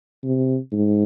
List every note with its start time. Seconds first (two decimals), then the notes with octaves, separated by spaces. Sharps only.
0.24 C3
0.73 G#2